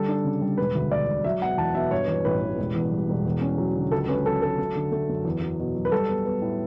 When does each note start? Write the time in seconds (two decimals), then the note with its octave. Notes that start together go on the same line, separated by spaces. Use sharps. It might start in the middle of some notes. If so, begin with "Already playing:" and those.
Already playing: D3 G3 A4
0.08 D4
0.24 C#3
0.41 G3
0.58 E1 B4
0.75 D2
0.91 E1 D5
1.08 E1
1.24 F#3 E5
1.42 B2 F#5
1.58 E2 A5
1.75 B2 E5
1.91 G2 C#5
2.08 E3
2.25 A1 B4
2.41 A1
2.58 E1
2.75 E2
2.91 G3
3.09 E1
3.25 E2
3.41 C#4
3.58 F#3
3.76 D3
3.92 C#2 A4
4.08 C#4 B4
4.25 F#3 A4
4.42 F#3 A4
4.58 A3
4.75 D3
4.92 A3
5.09 F#2
5.25 E2
5.42 F#3
5.59 B2
5.75 F#3
5.85 B4
5.92 G3 A4
6.09 B3
6.26 B3
6.42 A2